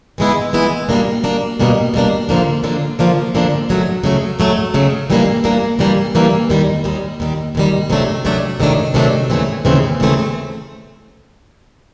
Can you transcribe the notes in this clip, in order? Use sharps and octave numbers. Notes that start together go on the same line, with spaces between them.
E3 G#3 B3 E4
E3 G#3 B3 E4
B2 G3 A#3 D4
B2 G3 A#3 D4
B2 G3 A#3 D4
B2 G3 A#3 D4
D3 F3 A#3 D4
D3 F3 A#3 D4
D3 F3 A#3 D4
D3 F3 A#3 D4
C#3 F#3 A3
C#3 F#3 A3
C#3 F#3 A3
C#3 F#3 A3
E3 G3 A#3 D4
E3 G3 A#3 D4
E3 G3 A#3 D4
E3 G3 A#3 D4
D#2 D#3 G3
D#2 D#3 G3
D#2 D#3 G3
D#2 D#3 G3
C3 D#3 F#3 A3 D4
C3 D#3 F#3 A3 D4
C3 D#3 F#3 A3 D4
C3 D#3 F#3 A3 D4
D#2 C#3 E3 A3 C4
D#2 C#3 E3 A3 C4
D#2 C#3 E3 A3 C4